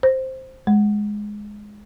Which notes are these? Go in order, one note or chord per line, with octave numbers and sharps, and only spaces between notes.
C5
G#3